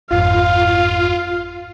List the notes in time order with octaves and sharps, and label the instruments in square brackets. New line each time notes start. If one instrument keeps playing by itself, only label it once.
[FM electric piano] G1 F2 G#2 [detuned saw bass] F4 [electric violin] F5